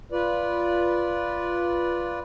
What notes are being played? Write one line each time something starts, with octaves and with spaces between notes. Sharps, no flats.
F4 B4 D5